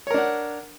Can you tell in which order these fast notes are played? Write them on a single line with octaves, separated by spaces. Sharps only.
C#5 A#4 D4 F#5